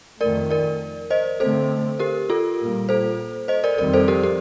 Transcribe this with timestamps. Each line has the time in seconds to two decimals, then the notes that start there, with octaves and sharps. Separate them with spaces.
0.21 F2 D#3 A3 A#4 D5
0.51 A#4 D5
1.10 C5 D#5
1.40 D3 A3 C4 A4 C5
1.99 G4 A#4
2.30 F4 A4
2.60 A#2 G3 A#3
2.89 A4 C5
3.48 C5 D#5
3.64 A#4 D5
3.78 F2 D#3 G3 C4 A#4 D5
3.93 A4 C5
4.08 G4 A#4
4.23 G4 A#4